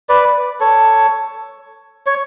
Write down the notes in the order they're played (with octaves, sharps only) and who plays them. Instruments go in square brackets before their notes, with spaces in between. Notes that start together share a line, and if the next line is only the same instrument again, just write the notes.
[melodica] B4 D5
A4 C#5
C#5